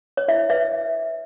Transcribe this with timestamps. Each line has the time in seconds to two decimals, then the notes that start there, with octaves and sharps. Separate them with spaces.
0.17 C#5
0.28 E4 E5
0.50 B4 E5